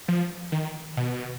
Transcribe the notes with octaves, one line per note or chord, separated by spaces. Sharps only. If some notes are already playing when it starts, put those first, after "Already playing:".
F3
D#3
B2